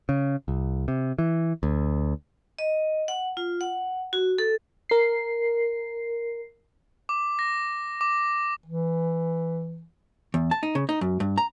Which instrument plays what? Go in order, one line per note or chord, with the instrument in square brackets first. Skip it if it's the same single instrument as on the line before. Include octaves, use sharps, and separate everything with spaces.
[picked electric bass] C#3
C2
C3
E3
D2
[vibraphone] D#5
F#5
F4
F#5
F#4
A4
[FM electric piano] A#4 C7
[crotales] D6
A#6
D6
[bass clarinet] E3
[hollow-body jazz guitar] E2
A5
D#4
C#3
D#4
F#2
G2
A#5